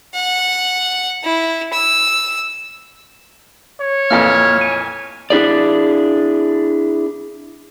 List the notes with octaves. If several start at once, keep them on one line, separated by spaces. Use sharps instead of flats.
F#5
E4
E6
C#5
F2 A#2 E3 A#3 F6
G#5
D4 E4 G#4 D5